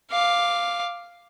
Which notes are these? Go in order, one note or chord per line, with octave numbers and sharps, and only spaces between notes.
F5 D6